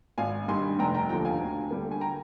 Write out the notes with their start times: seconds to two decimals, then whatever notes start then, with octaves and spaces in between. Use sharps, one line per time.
0.18 G#1 F5 G#5
0.48 G2 D#3 G3 G#5 C6
0.79 F1 G5 A#5
0.95 G5 A#5
1.09 D#2 D3 F3 G5 A#5
1.25 F5 G#5
1.41 D2
1.70 D3 G3 A#3
1.91 G#5
2.01 G5 A#5